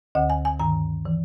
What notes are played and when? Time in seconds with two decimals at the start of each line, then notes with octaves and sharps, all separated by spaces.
0.15 D2 D3 F#5
0.30 G#5
0.45 G#5
0.59 G2 D#3 A#5
1.05 E3